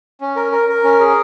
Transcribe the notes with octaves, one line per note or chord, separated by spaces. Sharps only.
C#4
A#4
A#4
A#4
C#4
G#4